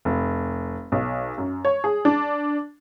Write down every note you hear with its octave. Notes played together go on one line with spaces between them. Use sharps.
F1
B1
F#2
C#5
G#4
D4